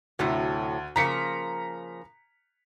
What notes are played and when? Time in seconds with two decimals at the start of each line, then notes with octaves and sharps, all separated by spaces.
0.19 D2 A2 C3 F#3
0.96 C#3 F3 A#3 A#5 B6 C#7